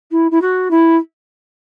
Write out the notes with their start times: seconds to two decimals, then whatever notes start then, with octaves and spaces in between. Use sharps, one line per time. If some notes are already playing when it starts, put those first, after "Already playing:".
0.11 E4
0.31 E4
0.41 F#4
0.70 E4